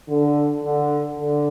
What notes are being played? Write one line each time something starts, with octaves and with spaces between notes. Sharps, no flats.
D3
D3
D3